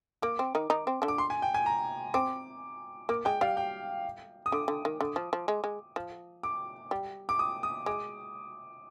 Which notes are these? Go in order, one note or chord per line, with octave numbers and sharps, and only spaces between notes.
A#3 D6
C4
D#3 D#4
D#3 D#4
C4
D3 D4
D6
C6
G#5
G5
G#5
A#5
C4 D6
A#3 D6
G#3 G5
G3 F5
G5
D#6
D3 D6
D3
D#3
D3
F3
F3
G#3
G#3
F3
D6
G3
D6
D#6
D#6
G#3 D6